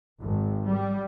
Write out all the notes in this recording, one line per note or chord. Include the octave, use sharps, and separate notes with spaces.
G#1
G3